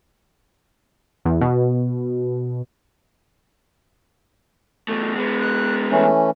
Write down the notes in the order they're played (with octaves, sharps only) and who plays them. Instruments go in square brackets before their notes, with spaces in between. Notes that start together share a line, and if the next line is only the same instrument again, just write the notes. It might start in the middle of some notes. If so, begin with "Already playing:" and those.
[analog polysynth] E2
B2
[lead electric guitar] E2 A3
G#3 B3
[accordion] F#6
E3 A3 C#4